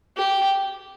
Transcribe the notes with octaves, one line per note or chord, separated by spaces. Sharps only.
G4